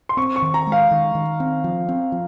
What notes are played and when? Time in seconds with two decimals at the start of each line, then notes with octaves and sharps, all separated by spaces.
0.09 C6
0.17 C4 C#6
0.36 C#6
0.42 D#3
0.54 A#5
0.67 G#3
0.72 F5
0.91 D#3
1.15 D#3
1.40 C4
1.64 F3
1.89 C4
2.12 F3